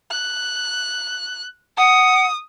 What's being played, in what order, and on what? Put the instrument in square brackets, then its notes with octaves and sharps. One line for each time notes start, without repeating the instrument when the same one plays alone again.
[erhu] F#6
[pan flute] F#5 [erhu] D#6